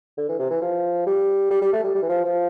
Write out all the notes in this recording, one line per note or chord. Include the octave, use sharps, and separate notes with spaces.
D3
E3
C3
E3
F3
G3
G3
G3
A3
G3
G3
E3
F3
F3